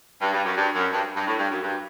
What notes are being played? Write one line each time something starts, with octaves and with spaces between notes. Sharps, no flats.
G2
G2
F#2
G2
F#2
G2
G2
A2
G2
F#2
G2